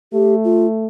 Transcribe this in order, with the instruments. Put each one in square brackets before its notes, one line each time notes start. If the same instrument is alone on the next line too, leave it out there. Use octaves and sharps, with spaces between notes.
[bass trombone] A3 [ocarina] G4
[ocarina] F4